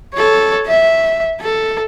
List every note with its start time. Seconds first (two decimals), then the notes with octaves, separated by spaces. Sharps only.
0.14 A4 C#5
0.67 E5
1.41 A4